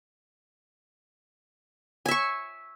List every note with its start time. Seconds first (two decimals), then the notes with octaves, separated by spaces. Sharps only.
2.06 G#5
2.08 E5
2.11 C#6